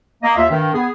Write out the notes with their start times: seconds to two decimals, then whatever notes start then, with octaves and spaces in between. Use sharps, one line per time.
0.22 A#3 D#5
0.37 D#2 F4 E5
0.49 G2 D#3
0.73 B3 G#4